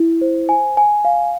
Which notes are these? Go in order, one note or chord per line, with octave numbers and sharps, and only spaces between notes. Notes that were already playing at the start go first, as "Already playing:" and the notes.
Already playing: E4
C5
G#5
G#5
F5